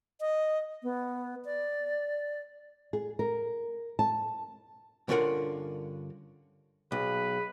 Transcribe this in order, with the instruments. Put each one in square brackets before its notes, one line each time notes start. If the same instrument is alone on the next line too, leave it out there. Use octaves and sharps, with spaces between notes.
[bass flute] D#5
B3
D5
[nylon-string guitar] G#4
A#4
A5
[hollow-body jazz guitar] G2 D3 C#4 F4 A#4 F#5
[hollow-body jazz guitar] B1 [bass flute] G#4 [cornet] B4